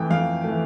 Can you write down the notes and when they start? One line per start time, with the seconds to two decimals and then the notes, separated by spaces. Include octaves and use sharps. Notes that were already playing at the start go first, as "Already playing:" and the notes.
Already playing: F2 E3 A3 G5
0.10 F2 F5
0.44 E3 A3